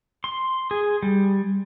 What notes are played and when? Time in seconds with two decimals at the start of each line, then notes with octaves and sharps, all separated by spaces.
0.24 C6
0.71 G#4
1.03 G3